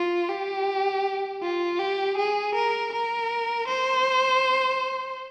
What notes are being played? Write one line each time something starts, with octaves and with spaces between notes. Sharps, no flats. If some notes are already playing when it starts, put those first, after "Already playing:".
Already playing: F4
G4
F4
G4
G#4
A#4
A#4
C5